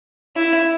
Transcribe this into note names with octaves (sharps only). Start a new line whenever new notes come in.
E4